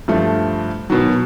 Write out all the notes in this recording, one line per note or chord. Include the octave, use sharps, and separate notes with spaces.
G2 F3 A3
B2 D#3 F#3